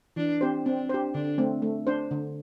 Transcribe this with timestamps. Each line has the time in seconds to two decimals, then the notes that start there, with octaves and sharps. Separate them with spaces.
0.16 E3 D4
0.41 C4 G4 C5
0.66 C4 D4
0.89 G4 C5
1.14 D3 D4
1.38 A3 C4
1.62 A3
1.87 D4 C5
2.11 D3